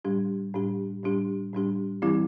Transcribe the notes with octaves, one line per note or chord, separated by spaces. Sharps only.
A2 G3 D4 G4
A2 G3 D4 G4
A2 G3 D4 G4
A2 G3 D4 G4
E3 G3 C4 E4 G4